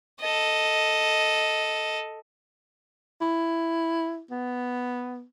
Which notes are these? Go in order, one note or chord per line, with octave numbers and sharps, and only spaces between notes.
A4 D#5
E4
B3